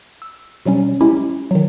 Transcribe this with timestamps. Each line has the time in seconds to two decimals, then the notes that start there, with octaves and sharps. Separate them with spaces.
0.22 E6
0.65 B2 F#3 G3 C#4
1.01 G#3 C#4 E4 G4
1.51 D#3 F#3